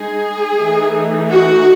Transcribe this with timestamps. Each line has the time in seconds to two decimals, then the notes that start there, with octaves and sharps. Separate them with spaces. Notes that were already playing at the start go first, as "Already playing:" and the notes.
Already playing: G#3 D#4 G#4
0.60 E3 A3 D#4
1.30 F#4